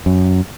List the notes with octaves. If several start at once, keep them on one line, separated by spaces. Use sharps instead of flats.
F#2